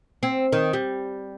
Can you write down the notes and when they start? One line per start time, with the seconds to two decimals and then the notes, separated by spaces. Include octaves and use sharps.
0.23 C4
0.53 D#3
0.73 G3